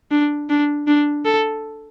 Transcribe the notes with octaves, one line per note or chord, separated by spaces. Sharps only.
D4
D4
D4
A4